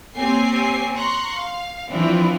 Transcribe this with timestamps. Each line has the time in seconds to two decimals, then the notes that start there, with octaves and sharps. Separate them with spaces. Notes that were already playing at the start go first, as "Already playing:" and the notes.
0.15 A#3 C4 G4 C#5 G#5 C7
0.96 A#5 C6 C#6 F#6
1.36 F5
1.89 E3 F3 C4 D4 E4